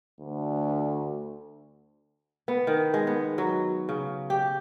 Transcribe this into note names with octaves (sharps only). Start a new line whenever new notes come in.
D2
B3
D#3
G#3
B3
F#3
C#3
G4